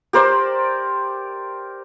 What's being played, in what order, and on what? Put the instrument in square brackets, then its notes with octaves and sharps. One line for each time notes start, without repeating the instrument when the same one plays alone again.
[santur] G4 A#4 C5 D5